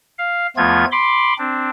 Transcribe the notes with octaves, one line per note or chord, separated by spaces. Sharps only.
F5
E2 F3 A3 B3 F4 G#6
B5 C6 D6
C4 D4